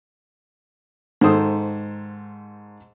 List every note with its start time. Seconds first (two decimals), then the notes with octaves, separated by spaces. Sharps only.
1.21 G#2 D#3 A4 C5 D#6